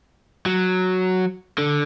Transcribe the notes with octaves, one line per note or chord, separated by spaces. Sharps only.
F#3
D3